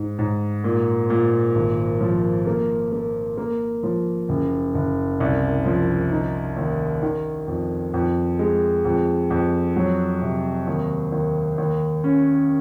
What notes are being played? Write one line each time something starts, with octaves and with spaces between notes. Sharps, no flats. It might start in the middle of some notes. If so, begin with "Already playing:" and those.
Already playing: G#2
G#2
A#2
A#2
G#1
F3
A#3
A#3
A#3
F3
F#1
F#1
C2
F3
D#4
D#2
D#3
F2
F2
G#3
F2
F2
F#3
C3
D#2
D#2
D#2
C#4